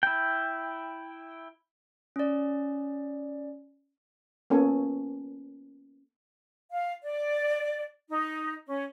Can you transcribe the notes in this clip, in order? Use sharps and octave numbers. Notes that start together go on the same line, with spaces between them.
E4 G5
C#4 D5
A#3 B3 C#4 A4 C#5 G#5
F5
D5
D#4
C#4